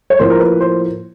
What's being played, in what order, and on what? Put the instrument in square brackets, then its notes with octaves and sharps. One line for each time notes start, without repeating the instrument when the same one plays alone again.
[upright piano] C#5
[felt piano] A2 F3 A#3 [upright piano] C5
[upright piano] A#4
B4
C5